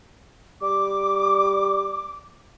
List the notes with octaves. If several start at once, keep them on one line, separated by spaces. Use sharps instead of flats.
G3 D6